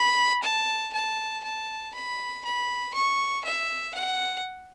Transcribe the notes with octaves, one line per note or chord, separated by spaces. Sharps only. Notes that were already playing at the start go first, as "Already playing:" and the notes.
Already playing: B5
A5
A5
A5
B5
B5
C#6
E5
F#5